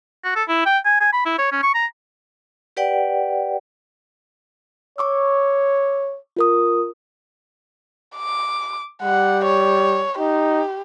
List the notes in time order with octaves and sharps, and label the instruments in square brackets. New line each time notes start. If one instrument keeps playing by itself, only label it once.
[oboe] F#4
A4
E4
G5
G#5
G#5
B5
E4
C#5
C#4
C#6
A#5
[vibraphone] G4 B4 D5 F#5 G5
[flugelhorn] C#5 [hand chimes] C#6 D6 E6
[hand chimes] F4 A#4 D#6
[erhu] D6
[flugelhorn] G3 [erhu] F#5
[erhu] C#5
[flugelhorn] D#4 [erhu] G4